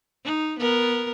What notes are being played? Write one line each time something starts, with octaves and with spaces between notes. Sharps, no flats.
D#4
B3 A#4